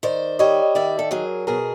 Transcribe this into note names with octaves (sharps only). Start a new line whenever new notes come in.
D#3 C5 D5
G3 C#5 D#5
D#3 D5 E5
A4
F#3 G#4 A#4
B2 G#4 A#4